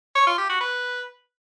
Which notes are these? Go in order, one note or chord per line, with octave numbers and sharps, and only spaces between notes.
C#5
F4
G4
F#4
B4